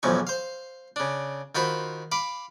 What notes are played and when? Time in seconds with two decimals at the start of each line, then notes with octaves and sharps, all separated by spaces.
0.03 B1 E2 G#2 F3 C#6
0.27 C5 F5
0.96 C#3 D4
1.55 D#3 F4 F#4 C5 B5
2.12 F5 B5 D6